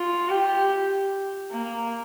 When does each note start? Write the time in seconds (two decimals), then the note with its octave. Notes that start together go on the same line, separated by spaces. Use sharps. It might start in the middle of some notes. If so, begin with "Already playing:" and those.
Already playing: F4
0.29 G4
1.52 A#3